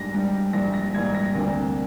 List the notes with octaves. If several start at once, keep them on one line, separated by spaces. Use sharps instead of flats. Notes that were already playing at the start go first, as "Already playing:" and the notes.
Already playing: G#2 G3 D4 A#6
G#2 G3 D4
A#1 G#2 G3 A#6
A#6
A#1 G#2 G3 G#6
A#6
D2 C3 G3 A#3 D4